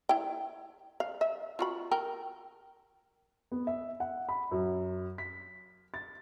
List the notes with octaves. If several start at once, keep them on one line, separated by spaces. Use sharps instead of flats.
E4 G5
F5
E5
F4 F#4 B5
A#4 G5
B3
E5
F#5
B5
F#2
B6
A6